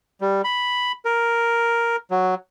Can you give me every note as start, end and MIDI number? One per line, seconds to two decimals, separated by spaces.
0.21 0.42 55
0.44 0.92 83
1.05 1.96 70
2.11 2.35 54